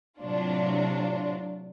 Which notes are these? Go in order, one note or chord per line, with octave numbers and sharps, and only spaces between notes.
A2 C3 F#3 D4 F4